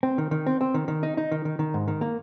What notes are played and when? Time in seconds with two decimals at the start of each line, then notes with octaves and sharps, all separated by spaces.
0.03 C4
0.18 D#3
0.31 D#3
0.46 C4
0.61 C4
0.74 D#3
0.88 D#3
1.03 D#4
1.17 D#4
1.32 D#3
1.45 D#3
1.59 D#3
1.74 G#2
1.88 D#3
2.01 A#3